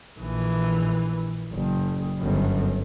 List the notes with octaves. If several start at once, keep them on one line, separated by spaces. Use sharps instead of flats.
A#1 E3
F#1
G1 F#2